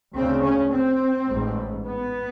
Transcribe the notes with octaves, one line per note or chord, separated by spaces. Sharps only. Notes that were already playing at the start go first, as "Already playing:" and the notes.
D2 C#3 C4
C#4
C4
A1 G#2
B3